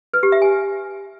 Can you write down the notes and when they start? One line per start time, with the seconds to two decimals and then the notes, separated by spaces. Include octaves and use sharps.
0.14 B4
0.23 G4
0.32 E5
0.42 G#5